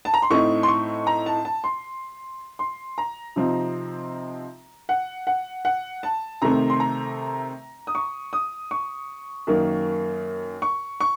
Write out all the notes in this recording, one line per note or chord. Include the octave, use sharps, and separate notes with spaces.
A5
A#5
C6
A2 A3 C4 D#4 C#6
C6
C#6
A#5
A5
A5
C6
C6
A#5
C3 F3 C4 D#4
F#5
F#5
F#5
A5
C3 D#3 A3 C4 A#5
C6
A#5
D#6
C#6
D#6
C#6
F#2 D#3 A#3
C#6
C#6